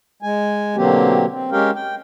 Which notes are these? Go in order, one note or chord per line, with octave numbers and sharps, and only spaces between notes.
G#3 G#5
B2 D3 F#3 A#3 C4 G4
C4
G#3 C#4 G4 A#4 F5 G5
G5